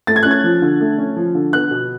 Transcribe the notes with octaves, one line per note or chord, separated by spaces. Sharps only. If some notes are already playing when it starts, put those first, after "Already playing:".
A3 A6
G#6
C#4 F#6
G#6
F3
D3
A3
C#4
F3
D3
B3 F#6
B2